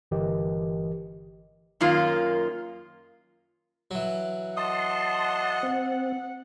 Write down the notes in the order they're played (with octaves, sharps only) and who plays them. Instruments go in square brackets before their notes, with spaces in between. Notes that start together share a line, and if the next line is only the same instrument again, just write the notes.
[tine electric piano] G1 E3 G4 A#4 D#5
[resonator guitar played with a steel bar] F#2 D#3 A#3 F4
[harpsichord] E3 F#3
[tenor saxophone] D#5 [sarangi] F#5 [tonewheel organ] A5 C6
[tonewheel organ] C4